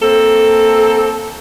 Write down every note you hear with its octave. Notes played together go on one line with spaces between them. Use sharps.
A#3 C4 A4